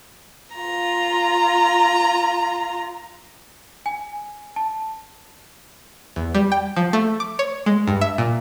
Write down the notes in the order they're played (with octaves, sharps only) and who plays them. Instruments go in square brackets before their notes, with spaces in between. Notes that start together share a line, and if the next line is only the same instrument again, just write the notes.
[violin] F4 A#5
[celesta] G#5
A5
[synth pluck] E2
G3
G5
F3
A3
D6
C#5
G#3
G2
E5
A#2